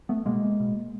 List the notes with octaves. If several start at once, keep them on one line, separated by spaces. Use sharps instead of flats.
A3 B3
B2 G#3 A#3
B2